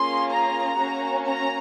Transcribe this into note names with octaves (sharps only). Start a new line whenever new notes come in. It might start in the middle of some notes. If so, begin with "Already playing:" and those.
Already playing: A#3 C#4 F4 G#4 C6
A#5
A#3 C#4 F#4
A#5